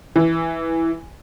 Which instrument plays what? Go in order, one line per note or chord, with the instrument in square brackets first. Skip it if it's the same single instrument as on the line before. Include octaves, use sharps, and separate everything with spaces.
[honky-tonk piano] E3